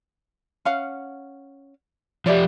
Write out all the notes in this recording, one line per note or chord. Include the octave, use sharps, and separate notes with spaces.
C#4 F5 F#5
F3 G4 C#5 D5 E5